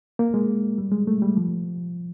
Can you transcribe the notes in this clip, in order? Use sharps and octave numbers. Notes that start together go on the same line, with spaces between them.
A#3
G#3
G3
G#3
A3
G3
F3